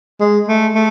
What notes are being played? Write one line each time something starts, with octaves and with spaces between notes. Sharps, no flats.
G#3
A3
A3